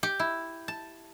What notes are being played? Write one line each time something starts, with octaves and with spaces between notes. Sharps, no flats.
G4
E4
A5